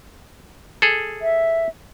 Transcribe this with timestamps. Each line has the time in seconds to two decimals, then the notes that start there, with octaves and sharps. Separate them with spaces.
0.82 G#4 A4
1.22 E5